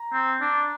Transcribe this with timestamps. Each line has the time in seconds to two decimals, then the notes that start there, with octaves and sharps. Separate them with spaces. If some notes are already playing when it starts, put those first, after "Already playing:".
Already playing: A#5
0.13 C4
0.41 D4